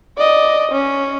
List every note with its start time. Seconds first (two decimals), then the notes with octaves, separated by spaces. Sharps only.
0.17 D5 D#5
0.72 C#4